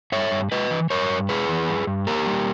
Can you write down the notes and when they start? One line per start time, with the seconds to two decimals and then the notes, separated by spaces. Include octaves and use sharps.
0.12 G2 C#5 E5
0.32 G2
0.52 G#3 B4 D#5
0.71 E3
0.90 G2 A#4 C#5
1.09 G2
1.29 G#3 G#4 B4
1.49 E3
1.69 G2
1.87 G2
2.07 A#3 G4 A#4
2.26 G3